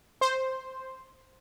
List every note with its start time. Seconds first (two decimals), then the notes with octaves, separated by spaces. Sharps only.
0.21 C5